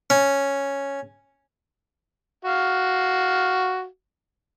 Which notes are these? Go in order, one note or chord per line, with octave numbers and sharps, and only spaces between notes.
C#4
F#4 F5